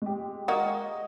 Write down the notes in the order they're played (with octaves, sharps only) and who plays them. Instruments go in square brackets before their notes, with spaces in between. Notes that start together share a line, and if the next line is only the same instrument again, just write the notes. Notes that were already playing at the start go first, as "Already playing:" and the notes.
[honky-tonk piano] G#3 G4
[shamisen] A#3 F#4 [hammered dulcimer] D#5